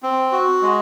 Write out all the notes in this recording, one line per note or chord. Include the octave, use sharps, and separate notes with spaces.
C4
F#4
G#3